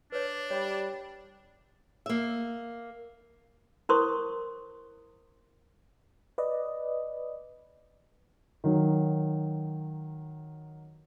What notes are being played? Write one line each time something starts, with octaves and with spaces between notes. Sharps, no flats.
D4 B4 C#5
G3 C#5 E5 B5
A#3 E5
E4 A#4 C5 C6 C#6 D#6
B4 D5 D#5
D#3 F#3